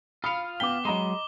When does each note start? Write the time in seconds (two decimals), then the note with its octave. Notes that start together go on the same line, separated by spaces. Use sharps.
0.24 F4 F5 B5 D#6 C#7
0.60 B3 G5 D6 B6 G7
0.85 F#3 G#3 D#5 A#5 B5